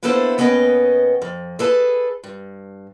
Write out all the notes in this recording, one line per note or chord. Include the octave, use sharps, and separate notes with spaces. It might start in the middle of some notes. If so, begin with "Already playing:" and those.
A#3 B3 D4 E4 A4 C5
D#2 B3 C#4 B4 D#5 G5
F2
G#4 A4 B4 A5
G2